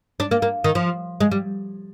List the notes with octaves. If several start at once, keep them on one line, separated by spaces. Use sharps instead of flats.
D4
A#3
A#3
D#3
F3
G#3
G3